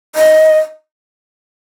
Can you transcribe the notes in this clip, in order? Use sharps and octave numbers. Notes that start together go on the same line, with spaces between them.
D#5